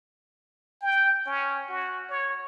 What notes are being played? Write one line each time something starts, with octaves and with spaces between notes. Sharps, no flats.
G5
C#4
F#4
C#5